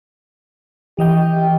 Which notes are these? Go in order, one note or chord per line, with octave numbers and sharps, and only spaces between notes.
E3 G4 D#5 G5